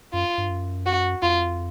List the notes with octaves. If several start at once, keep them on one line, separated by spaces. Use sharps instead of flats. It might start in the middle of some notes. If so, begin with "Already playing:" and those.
F#2 F4
G2
F#2
F#4
F2 F4